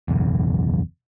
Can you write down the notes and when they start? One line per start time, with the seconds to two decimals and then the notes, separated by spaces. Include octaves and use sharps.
0.08 F#1 B1 E2